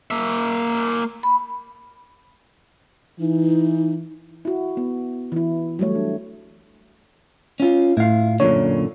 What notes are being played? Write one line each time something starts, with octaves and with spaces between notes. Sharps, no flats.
A#3 E5
B5
E3 D#4
E4 F#4
B3
E3 E4
F#3 G3 A3 C#5
D4
C#4 F4
A2 E4 F5
F#2 A#2 D3 C#5